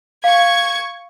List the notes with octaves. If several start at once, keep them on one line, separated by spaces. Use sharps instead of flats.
F5 C#6 G#6